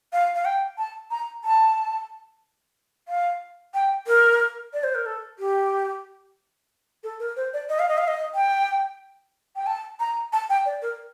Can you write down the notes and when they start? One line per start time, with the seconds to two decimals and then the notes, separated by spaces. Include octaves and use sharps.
0.13 F5
0.35 F5
0.45 G5
0.78 A5
1.11 A#5
1.44 A5
3.08 F5
3.74 G5
4.07 A#4
4.74 D5
4.84 C5
4.95 A#4
5.06 A4
5.39 G4
7.03 A4
7.20 A#4
7.36 C5
7.53 D5
7.69 D#5
7.79 F5
7.89 D#5
7.98 F5
8.08 D#5
8.35 G5
9.56 G5
9.67 A5
10.00 A#5
10.33 A5
10.50 G5
10.65 D5
10.82 A#4